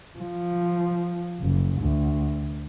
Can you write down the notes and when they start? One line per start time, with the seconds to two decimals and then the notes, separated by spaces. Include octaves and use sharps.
0.19 F3
1.41 F#1
1.81 D2